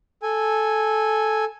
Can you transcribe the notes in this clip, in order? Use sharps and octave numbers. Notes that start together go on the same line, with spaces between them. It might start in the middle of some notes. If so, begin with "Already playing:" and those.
A4 G#5